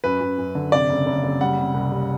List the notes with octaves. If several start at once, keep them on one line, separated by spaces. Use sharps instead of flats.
F#2 B4
F#2
F#2
D3
C3 D5
F#1
F#1
F#1
G3 F#5
C3
C2
G3